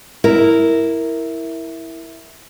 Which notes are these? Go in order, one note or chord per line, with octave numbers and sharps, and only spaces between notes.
E4 A#4